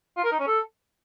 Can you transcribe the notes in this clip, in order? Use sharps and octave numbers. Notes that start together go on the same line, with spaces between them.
F4
A#4
D#4
C#4
A4